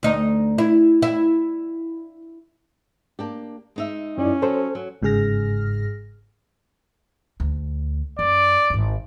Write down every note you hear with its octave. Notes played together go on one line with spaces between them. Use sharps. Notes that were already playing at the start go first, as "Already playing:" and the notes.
D2 D#4
E4
E4
A#3 D4 G4
G#3 D#4 E5
F#2 C#4 E4 D5
F#3 A4 C5
F#3
G1 G#2 C#3 G#4 F6 A#6
D2
F#2 D5
D#1 G#1